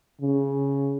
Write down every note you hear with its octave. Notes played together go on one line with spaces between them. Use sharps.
C#3